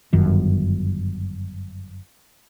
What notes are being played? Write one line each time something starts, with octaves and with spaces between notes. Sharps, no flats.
G1 F#2 D#3